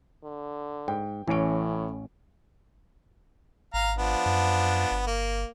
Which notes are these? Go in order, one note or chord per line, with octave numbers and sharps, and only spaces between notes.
D3
G#2 G5
A1 A2 E3 C#4 C#5 D7
G#1 F5 A#5
F3 B3 D4
F#2
G1
A#3